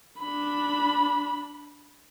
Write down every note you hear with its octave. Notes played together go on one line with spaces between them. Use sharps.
D4 B5